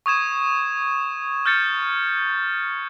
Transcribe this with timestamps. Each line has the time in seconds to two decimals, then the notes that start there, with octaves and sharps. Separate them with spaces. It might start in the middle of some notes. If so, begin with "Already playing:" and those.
0.06 C#6 D#6 G#6 E7
1.46 F6 G6 A6 C#7